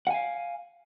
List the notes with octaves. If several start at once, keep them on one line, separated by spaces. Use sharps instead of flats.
F5 F#5 G#5